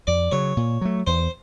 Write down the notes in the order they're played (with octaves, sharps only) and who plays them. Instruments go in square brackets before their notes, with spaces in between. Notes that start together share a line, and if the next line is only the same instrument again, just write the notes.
[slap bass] F2 [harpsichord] D5
[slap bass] C#3 F#3 [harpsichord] C#5
[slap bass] A#2
F#3 A3
[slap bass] E2 [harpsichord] C5